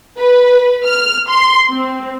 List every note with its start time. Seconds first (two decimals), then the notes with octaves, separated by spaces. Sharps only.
0.18 B4
0.85 F6
1.28 C6
1.71 C4